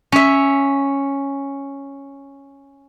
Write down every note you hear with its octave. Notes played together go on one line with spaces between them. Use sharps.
C#4 E5